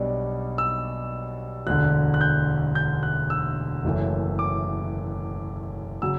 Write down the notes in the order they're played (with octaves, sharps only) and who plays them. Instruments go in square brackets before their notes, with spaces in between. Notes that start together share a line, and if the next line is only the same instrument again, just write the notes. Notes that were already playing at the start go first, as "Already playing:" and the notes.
Already playing: [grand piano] B1 B2 G3 D4
E6
E1 D2 D3 F#6
F#6
G6
G6
F#6
E6
F#1 F#2 E3 A3
D6
C#3 F#3 E6